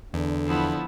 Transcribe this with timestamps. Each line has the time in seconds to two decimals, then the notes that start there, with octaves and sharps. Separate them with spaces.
0.14 E2 D3
0.47 F3 B3 E4